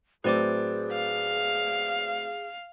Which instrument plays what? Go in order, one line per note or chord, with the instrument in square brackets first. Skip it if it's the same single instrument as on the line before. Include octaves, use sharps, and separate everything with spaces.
[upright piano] A2 F#3 C4 [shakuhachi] G#4 [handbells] B4 D5 D6
[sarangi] F5